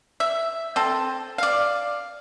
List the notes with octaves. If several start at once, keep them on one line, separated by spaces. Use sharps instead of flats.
E5
C4 A4
D5 F5